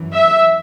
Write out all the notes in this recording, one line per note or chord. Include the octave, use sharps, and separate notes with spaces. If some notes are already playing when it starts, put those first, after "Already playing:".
Already playing: F#2 E3
E5